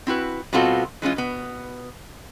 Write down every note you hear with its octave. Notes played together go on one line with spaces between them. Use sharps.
C4 E4 F#4 B4
B2 G3 C4 F4 F#4 A4
E3 G#3 C#4 F4
B2 B3